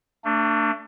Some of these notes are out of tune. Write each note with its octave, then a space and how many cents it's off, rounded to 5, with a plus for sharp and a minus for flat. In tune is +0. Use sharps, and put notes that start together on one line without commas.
A3 +35 D4 +0